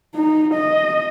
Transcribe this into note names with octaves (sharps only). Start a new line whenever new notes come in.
D#4
D#5